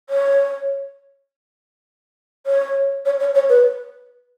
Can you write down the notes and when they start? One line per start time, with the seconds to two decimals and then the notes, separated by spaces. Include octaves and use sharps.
0.10 C#5
2.47 C#5
3.05 C#5
3.20 C#5
3.35 C#5
3.49 B4